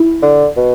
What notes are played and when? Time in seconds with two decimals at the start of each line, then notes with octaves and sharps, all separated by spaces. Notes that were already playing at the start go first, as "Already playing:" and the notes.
Already playing: E4
0.23 D3
0.57 B2